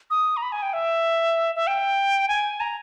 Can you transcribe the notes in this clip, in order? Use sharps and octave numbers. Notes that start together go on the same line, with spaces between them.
D#6
A#5
B5
G#5
G5
E5
E5
G5
G#5
A#5